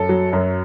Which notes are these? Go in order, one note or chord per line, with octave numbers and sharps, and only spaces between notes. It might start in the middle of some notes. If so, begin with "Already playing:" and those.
Already playing: F#2 A4
F#3
F#2